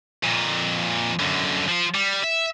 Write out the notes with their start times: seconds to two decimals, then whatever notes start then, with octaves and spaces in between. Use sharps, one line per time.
0.23 F2 A#2
1.20 F#2 D3
1.68 F3 F4
1.95 G3
2.24 E5